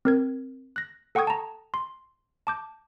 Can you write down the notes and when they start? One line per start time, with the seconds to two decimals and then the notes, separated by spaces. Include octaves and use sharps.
0.05 C4 A#4 G#6
0.76 F#6 A#6
1.15 A4 F#5 G5 C#6 D#6 G#6
1.27 A5 A#5
1.74 C6
2.47 A5 D6 G6